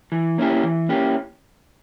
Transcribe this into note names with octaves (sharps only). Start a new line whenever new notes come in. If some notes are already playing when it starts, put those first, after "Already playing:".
E3
A#3 C#4 E4 G4
E3
A#3 C#4 E4 G4